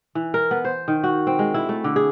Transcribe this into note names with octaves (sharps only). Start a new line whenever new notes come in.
E3
A#4
B3
C5
D#3
F#4
C4
G#3
E4
A3
D3
G#4